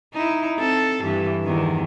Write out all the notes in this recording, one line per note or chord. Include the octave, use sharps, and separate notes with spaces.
D#4 E4
C4 A4
G2 E3
E2 D#3